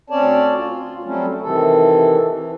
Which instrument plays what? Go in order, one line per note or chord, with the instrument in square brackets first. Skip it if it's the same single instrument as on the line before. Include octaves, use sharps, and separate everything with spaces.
[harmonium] D2 C4 C#4 C#5 D5 A5
F4
F#3 G3 A3 C4 C#4
C3 D#3 E3 A4
E3